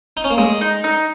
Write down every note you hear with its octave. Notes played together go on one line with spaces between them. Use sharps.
D#4
C#4
A#3
G#3 D#5
D#4
D#4